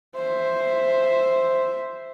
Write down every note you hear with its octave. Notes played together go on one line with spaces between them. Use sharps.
C5 E5